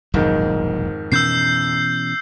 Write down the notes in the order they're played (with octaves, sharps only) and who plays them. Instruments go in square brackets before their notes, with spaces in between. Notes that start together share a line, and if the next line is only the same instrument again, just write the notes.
[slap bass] E1 A#1 F#3 [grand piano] F2 G#2 D#3
[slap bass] B2 E3 C#4 [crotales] E6 G6 C7